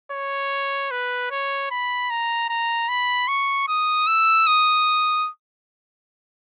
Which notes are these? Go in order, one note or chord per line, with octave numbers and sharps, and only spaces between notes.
C#5
B4
C#5
B5
A#5
A#5
B5
C#6
D#6
E6
D#6